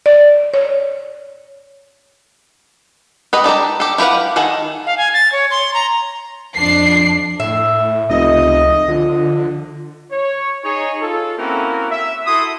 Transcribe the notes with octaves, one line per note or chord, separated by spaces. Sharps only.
D5
C#5
G4 B4 D#5
D4 G4 A4 A#5
G4 A4
E4 G4 B4 F5 F#5
D#3 G#4 A4 F#5
F5
G#5
A6
C#5
C6
A#5
F2 F3 D4 C7
A2 E5
F1 C#2 D#5
D3 F3
C#5
D#4 G#4 C#5
F4 A4
A#3 C4 C#4 E4 F#4 A#4
E5
E4 F#4 A4 C6 D#6